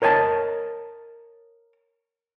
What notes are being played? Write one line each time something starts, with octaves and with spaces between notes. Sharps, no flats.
A#4 C#5 D#5 G#5 A5